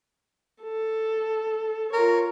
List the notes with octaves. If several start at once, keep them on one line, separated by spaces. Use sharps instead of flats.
A4
F4 A#4 C#5